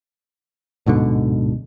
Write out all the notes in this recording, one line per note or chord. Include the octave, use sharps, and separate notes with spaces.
D1 G#2 B2 D3